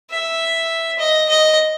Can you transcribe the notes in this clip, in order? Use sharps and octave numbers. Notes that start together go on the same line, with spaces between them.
E5
D#5
D#5